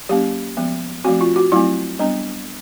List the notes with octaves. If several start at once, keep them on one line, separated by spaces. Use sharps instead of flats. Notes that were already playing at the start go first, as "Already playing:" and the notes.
F#3 A#3 C#4 G4
F3 G#3 B3
F3 A3 C4 F#4
F4
F#4
F#3 A3 C4 E4
G3 B3 D4